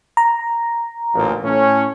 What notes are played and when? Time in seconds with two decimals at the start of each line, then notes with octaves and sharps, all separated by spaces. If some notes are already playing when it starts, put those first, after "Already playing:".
0.17 A#5
1.14 A1 D2 A#2
1.44 A2 A3 C#4